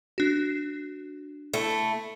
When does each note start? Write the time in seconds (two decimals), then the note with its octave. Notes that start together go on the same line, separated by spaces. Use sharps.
0.18 D4 F#4
1.54 A3 E4